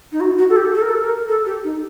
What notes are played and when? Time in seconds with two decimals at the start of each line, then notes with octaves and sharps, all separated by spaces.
0.12 D#4
0.20 F#4
0.38 F#4
0.50 A4
0.56 G4
0.75 A4
0.82 A#4
0.89 A4
1.01 A#4
1.28 A4
1.46 G4
1.64 D#4